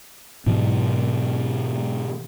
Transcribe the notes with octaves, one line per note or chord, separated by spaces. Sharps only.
G#2 B2 E3 F#3